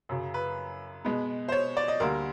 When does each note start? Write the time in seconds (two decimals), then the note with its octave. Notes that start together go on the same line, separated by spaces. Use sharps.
0.09 F#2 C#3 F#3
0.34 B4
1.05 B2 G#3 B3
1.48 C5
1.52 C#5
1.77 D5
1.88 D#5
2.00 D2 D3 G3 A#3 A#4